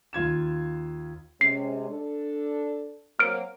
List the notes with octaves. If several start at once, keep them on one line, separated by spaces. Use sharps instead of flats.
D#2 F4 G#6 E7
C3 G#3 C#4 C7
D4 A4
F#3 A#3 C4 F6 D7